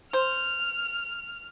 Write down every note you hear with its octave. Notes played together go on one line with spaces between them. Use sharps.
C5 F6